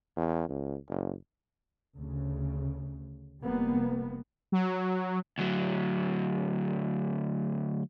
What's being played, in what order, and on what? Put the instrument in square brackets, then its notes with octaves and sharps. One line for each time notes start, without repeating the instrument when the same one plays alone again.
[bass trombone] E2
C#2
F#1
[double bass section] D2 C#3
F1 G3 A#3 B3
[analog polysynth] F#3
[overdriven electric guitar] D2 F#3